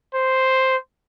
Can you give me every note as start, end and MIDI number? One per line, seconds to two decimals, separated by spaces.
0.14 0.77 72